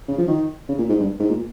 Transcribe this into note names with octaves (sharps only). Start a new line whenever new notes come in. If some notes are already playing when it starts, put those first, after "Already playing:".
C#3
F3
D#3
C#3
A#2
G#2
G2
G#2
A#2